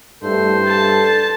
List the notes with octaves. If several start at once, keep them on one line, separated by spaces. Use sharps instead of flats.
G2 A3 E4 A4 C5
A4 A5